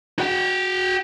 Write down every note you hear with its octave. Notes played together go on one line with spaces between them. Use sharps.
F#4 G5